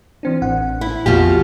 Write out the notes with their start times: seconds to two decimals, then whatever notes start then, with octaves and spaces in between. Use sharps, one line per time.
0.23 E3 C4 D4
0.42 A1 F#5
0.81 E4
1.06 A#1 F2 B2 F4 G4